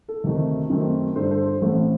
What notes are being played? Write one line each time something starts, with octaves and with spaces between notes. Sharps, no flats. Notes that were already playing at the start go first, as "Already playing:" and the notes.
A4
D2 C3 D#3 A3
F#2 D#3 A3 C4
G2 D3 G3 A4 C5
A4 C5
A4 C5
A1 A2 A3 C4 A4 C5